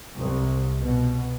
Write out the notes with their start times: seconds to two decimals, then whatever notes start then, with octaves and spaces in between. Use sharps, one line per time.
0.17 C2
0.79 B2